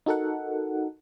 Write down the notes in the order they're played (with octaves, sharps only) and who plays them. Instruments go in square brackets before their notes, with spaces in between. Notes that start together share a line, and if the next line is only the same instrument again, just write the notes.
[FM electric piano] D#4 F#4 A4 A#4 F#5